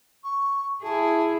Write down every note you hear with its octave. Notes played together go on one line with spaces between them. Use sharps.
C#6
E4 G#4 A5